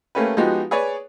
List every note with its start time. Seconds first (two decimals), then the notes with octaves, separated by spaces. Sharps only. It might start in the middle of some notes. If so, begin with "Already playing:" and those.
0.15 A3 A#3 C#4 G4 B4
0.37 F3 G#3 B3 D#4 F#4 G4
0.71 G#4 B4 C#5 D5